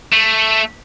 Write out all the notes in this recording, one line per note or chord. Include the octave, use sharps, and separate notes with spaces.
A3